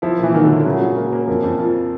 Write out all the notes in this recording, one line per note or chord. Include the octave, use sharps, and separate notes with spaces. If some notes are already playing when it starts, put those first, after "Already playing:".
F3 E4
A#2 E3
D#3 F#3
D3
A#2
C#3 F#3
F#3
A#3
A#3
F2
F2
F3